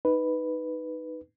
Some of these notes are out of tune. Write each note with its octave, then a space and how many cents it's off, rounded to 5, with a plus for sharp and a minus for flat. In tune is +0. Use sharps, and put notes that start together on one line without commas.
D#4 +0 B4 +0